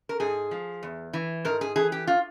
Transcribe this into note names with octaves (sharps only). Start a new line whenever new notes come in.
A#4
G#2 G#4
F3
E2
E3
G#2 A#4
G#4
E3 G#4
G4
F4